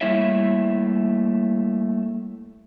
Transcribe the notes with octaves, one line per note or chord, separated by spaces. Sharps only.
G3 A3 A#3 E4 C#5 E5